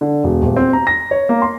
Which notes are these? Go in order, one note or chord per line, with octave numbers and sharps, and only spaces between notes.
D3
E1
D#1
C4
A#5
A#6
C#5
A#3
C6